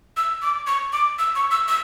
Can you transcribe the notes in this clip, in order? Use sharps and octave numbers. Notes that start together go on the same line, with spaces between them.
E6
D6
C#6
D6
E6
C#6
E6
E6